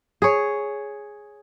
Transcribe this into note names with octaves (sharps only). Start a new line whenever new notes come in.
G#4 C#5